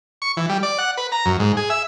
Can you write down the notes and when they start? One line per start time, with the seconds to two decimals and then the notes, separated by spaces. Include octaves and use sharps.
0.22 C#6
0.37 E3
0.49 G3
0.63 D5
0.78 F#5
0.97 B4
1.12 A#5
1.26 F#2
1.39 G#2
1.57 G#4
1.70 E5